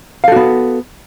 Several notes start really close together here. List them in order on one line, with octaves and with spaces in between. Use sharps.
F5 A4 F#4 B3